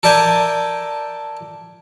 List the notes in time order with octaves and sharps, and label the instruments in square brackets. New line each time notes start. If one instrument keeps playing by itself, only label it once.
[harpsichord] A4 A#4 D5 E5 G5 G#5